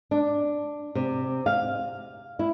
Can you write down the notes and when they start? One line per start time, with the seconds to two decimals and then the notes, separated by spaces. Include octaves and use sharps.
0.11 D4
0.95 C3
1.46 F5
2.39 E4